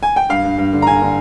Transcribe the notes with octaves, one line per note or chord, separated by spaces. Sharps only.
G#5
G5
G2 F5
G2
G2
D3
A#5
D3 G#5
D3